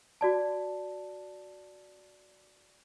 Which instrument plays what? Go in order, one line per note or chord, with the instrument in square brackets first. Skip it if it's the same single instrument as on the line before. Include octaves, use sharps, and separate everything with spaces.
[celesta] F#4 D5 A5